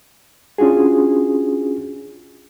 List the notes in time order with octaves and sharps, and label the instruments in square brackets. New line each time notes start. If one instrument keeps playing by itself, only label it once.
[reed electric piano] C#4 D4 F4 F#4 G#4